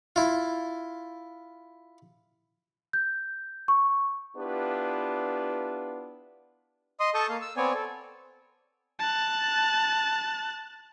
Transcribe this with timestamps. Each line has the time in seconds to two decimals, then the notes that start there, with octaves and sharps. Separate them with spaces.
0.16 E4 F4
2.93 G6
3.68 C#6
4.36 B3 D4 E4 F4 G4 B4
7.00 D#5 C6 D#6
7.14 A4 A5 C#6 D#6 G6
7.29 A#3 F5
7.42 E6
7.57 B3 C4 C#5 D5 G#5
7.74 A4
8.99 A5 F#6